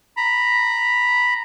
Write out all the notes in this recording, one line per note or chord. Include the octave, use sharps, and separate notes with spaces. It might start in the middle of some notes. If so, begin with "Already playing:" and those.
A#5 B5